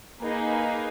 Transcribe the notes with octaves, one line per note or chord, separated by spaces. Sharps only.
A#3 D#4 G#4 B4